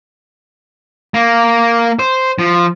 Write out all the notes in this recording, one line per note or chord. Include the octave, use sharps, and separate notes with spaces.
A#3
C5
F3